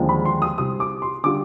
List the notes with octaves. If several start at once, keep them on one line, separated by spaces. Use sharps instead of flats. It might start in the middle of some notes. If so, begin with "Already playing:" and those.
Already playing: D#2 D3 F3 G#3
B5
C6
D#6
C2 C3 G3 D#6
D6
C6
D3 G3 D4 F4 D6